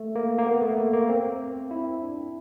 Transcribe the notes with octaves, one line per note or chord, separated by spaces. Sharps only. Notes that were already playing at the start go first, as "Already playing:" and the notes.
Already playing: A3
A#3
A#3
B3
A3
A#3
A#3
C4
E4
D4